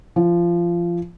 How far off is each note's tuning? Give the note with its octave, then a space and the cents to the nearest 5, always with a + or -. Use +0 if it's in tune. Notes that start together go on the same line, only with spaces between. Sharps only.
F3 -20